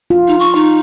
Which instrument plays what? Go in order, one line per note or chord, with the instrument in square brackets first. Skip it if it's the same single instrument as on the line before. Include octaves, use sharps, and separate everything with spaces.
[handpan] F4
[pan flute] D#4
C#6
D#4